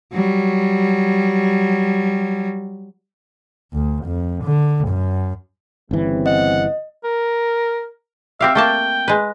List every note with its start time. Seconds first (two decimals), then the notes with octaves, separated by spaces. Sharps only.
0.13 F#3 G3
3.73 D2
4.04 F2
4.43 D3
4.88 F#2
5.91 G1 C#3 E3 G3 C4
6.26 D#5 F#5
7.04 A#4
8.41 C4 G4 E5 F5
8.55 A3 A#3 G5 A5
9.08 G#3 B4